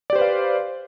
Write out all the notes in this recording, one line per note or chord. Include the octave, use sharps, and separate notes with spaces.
G4 B4 C5 D5 F5